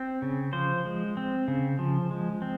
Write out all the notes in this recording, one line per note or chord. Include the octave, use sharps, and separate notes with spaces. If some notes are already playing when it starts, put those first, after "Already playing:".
Already playing: C4
C#3
F3 C5
G#3
C4
C#3
F3
G#3
C4